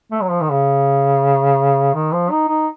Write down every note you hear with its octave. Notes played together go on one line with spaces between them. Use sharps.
A3
F#3
F3
D#3
C#3
D#3
F3
D#4
D#4